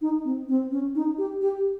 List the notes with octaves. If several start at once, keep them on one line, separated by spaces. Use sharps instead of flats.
D#4
C4
C4
C#4
D#4
G4
G4